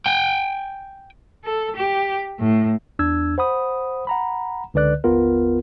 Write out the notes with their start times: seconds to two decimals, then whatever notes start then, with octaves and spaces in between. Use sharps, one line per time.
0.06 G5 G#5
1.44 A4
1.76 G4
2.39 A2
2.99 E2 D4 E6 G#6
3.38 C5 F#5 B5 D#6
4.07 F#5 A#5 B5
4.74 C#2 D3 B4 D5 F#6
5.04 G1 D#2 B3 F4 A#4